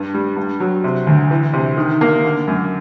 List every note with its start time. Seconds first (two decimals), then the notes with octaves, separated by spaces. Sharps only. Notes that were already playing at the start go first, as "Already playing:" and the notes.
Already playing: G2
0.14 G3
0.37 G2
0.60 F#3
0.84 C3
1.07 D2
1.31 E3
1.53 C3
1.77 D#3
2.01 A#3
2.25 D3
2.47 F#2